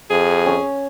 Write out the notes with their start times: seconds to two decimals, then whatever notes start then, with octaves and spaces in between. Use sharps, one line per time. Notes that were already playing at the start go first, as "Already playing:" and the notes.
0.10 F2 G#4
0.46 C#4 C#5